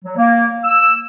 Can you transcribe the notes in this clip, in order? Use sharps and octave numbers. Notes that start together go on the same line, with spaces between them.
F#3
A#3
E6